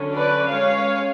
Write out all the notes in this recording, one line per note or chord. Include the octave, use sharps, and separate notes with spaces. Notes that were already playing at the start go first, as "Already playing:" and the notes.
Already playing: D3 F#3 C#4
B4 D5
G#3 C#4 C#5 F5